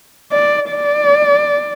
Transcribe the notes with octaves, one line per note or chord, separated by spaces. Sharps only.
D5
D5